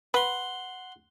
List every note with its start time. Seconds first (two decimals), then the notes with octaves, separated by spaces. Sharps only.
0.14 B4 F#5 C6